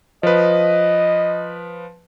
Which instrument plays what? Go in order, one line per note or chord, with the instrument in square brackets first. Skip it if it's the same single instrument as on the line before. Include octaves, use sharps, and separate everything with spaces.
[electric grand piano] F3 B4 [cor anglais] D#5